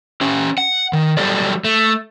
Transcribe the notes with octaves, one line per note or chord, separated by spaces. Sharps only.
C#4 G4
F#5
D#3
F#3 G3 G4 A4 A#4 D5
A3